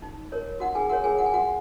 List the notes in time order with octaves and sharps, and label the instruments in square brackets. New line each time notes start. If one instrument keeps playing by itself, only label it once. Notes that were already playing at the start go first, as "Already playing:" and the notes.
[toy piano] D#4
A#4 C#5
D#4 F#4 F#5
G#4 G#5
F#4 A#4 C#5 F#5
G#4 G#5
F#4 F#5
G#5
F#4 F#5